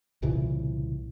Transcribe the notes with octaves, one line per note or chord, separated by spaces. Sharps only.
C2 A#2 C#3 E3